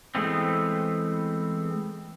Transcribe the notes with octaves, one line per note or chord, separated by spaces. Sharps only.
E3 G#3 A3 B3 C4